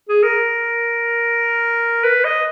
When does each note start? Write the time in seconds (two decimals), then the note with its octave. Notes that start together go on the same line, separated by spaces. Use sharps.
0.09 G#4
0.23 A#4
2.04 B4
2.24 D#5